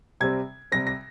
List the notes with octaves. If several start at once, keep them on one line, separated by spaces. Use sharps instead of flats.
C3 G3 C4 G#6
C3 G3 C4 A#6
A#6